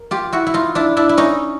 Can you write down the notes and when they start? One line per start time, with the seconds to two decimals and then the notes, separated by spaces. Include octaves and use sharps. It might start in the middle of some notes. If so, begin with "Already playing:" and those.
Already playing: A#4
0.11 F4 G4
0.32 E4 F#4
0.47 E4
0.54 D#4 F4
0.75 D4 E4
0.97 D4 E4
1.09 E4
1.17 C#4 D#4